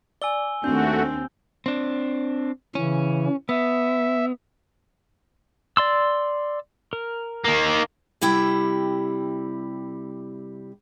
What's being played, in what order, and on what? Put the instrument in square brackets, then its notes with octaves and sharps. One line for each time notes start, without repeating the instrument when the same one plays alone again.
[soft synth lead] D5 [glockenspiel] G#5 E6 G7
[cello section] D#2 C4 [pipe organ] A3 F#4 [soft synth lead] D4 [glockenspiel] G6
[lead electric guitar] C4 D4
[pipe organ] C#3 E3 [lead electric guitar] C#4
[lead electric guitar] B3 [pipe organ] E5
[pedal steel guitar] D5 C6 E6
A#4
[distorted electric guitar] D#3 A#3
[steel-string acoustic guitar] C3 G3 E4 G5